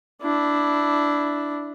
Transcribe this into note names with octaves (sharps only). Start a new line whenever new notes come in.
D4 E4